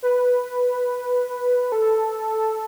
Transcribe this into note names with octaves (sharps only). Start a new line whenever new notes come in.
B4
A4